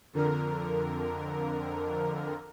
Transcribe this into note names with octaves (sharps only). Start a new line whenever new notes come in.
F2 D3 A#4